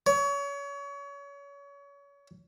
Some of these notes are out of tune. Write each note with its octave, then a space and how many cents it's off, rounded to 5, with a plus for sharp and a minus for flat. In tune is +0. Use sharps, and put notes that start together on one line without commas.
C#5 +30